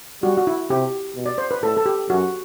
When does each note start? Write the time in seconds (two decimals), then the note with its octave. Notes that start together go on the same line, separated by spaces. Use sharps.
0.23 G3 F#4
0.37 F#4
0.47 E4
0.70 C3 G4
1.16 B2
1.26 D5
1.38 C5
1.51 B4
1.62 A2 A4
1.77 A4
1.86 G4
2.09 F#2 F#4